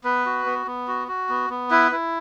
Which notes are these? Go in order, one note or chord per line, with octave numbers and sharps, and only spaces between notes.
B3 B4
F#4
B3
B3
F#4
F#4
B3
B3
E4 B4
E4